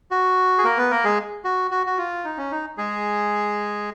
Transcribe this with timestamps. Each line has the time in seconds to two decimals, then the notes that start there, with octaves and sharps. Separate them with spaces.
0.11 F#4
0.58 G#4
0.64 A#3 A#4
0.78 B3 B4
0.91 A#3 A#4
1.04 G#3 G#4
1.44 F#4
1.71 F#4
1.87 F#4
1.98 F4
2.24 D#4
2.38 C#4
2.52 D#4
2.78 G#3 G#4